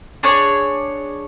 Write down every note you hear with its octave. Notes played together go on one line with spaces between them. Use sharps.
D4 G#4 C#5 G#5